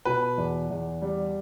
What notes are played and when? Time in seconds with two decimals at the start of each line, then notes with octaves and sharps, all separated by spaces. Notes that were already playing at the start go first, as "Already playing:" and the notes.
0.05 B2 B4
0.38 E2
0.70 E2
1.02 G3